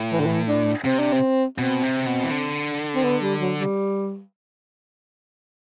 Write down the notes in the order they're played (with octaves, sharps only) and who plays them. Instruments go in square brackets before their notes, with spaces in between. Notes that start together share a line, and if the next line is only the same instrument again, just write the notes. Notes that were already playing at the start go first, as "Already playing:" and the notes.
Already playing: [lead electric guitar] A2
[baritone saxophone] E3
D3
E3
D4
[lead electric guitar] C3 [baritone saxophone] C4
[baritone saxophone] D4
C4
[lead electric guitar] B2 [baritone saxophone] C4
[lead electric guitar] C3
B2
E3
D3
[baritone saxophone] C4
B3
G3
F#3
G3